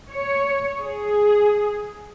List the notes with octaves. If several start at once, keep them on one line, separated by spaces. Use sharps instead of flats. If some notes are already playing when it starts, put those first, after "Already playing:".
C#5
G#4